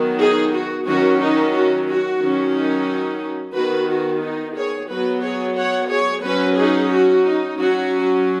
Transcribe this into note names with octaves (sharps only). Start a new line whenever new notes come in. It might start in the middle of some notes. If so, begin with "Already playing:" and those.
Already playing: D#3 F#3 B3
D#4 G#4
F#4
D#3 F#3 C#4 F#4
D#4
F#4
F#4
D#3 F#3 C#4
D#4
D#3 B3 F#4 B4
F#4
D#4
G#4 C#5
F#3 B3 F#4 B4
G#4 C#5
C#5 F#5
G#4 C#5
F#3 C#4 F#4 B4
D#4 G#4
F#4
D#4
F#3 C#4 F#4